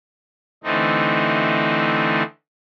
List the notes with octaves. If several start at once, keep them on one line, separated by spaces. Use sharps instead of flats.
D3 E3 A3 C4 D#4